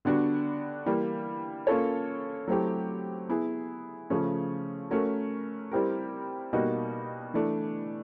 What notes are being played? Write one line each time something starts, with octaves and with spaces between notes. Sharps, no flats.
D3 G3 B3 D4 F#4
E3 G3 A#3
A#3 C#4 F4 A4 C#5
F#3 A3 C4 E4 G4
B3 E4 G#4
C#3 F3 A3 C#4
A3 C#4 F#4 A#4
G3 C4 E4 G4 A#4
B2 G3 A#3 D#4 F#4
E3 A3 D4